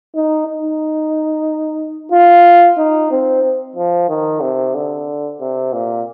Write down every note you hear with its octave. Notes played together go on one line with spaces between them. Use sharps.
D#4
D#4
F4
D#4
C4
F3
D#3
C3
D3
C3
A#2